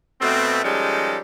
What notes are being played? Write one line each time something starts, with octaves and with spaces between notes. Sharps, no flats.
B2 A3 C4
D#3 F3 G3 G#3 C#4 A4